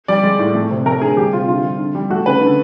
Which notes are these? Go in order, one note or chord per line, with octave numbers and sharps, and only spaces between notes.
G3 D5
G#3
A2
A3
C3
A3 A#4
D3 G#4
G3 G4
C3 F4
D3 F4
G3
D3
G3
A3 F#4
C#3 B4
D3